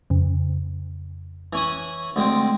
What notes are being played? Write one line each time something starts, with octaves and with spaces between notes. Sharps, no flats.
F2 C#3
E3 C#4 D#6
D2 G#3 C4